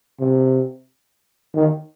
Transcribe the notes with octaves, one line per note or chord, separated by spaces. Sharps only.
C3
D#3